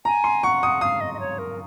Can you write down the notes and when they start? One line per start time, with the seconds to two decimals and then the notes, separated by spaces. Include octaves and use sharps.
0.05 G#5 A#5
0.24 C6
0.43 F#5 C#6
0.63 D#6
0.81 F5 D#6
1.01 D#5
1.14 D#5
1.20 C#5
1.39 A#4